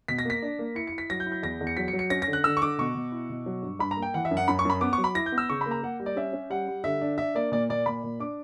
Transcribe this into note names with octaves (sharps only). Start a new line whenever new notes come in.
B2 B6
A#6
A#3 B6
D4
A#3
E4 C#7
E4 C#7
B6
F#3 A#6
G6
E4
G6
E2 A#6
E2
C#7
F#3 B6
C#7
F#3
C#7
C#4 A#6
A#6
D3
F#6
D3 E6
C#6
D3 D6
B2 C#6
B2
E4
B2
F#3
G2
G2 B5
A#5
A#3
G5
E3 F#5
E5
F#2
F#5
F#2 B5
C#6
F#2 B5
B3 D6
C#6
F#3
B5
E4 A#6
G6
B3
E6
C#3 C#6
A#3 B5
A#5
A#3 F#5
G3
D5
C#4 E5
C#4
G3 F#5
G3
D3 E5
D4
D4 E5
A#3 D5
A#2 D5
A#2 D5
A#2 B5
A#2
D4 D6